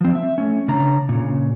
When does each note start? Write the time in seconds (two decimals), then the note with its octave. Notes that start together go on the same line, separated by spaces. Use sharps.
0.01 F3 C4
0.15 E5
0.38 A3 C#4
0.68 C#3 D4 A#5
1.09 A#2 C#3